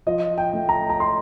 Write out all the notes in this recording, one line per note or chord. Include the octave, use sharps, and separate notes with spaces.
F3 D#5
G5
A3
A#5
A#5
C6